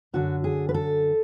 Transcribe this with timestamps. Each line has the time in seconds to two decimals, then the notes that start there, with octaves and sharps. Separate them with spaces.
0.13 F#2 D3 F#4
0.44 G#4
0.69 B4
0.74 A4